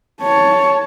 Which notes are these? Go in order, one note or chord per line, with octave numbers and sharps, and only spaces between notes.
C#5 A5